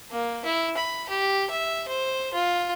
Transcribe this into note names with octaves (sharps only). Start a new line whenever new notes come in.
A#3
E4
B5
G4
E5
C5
F4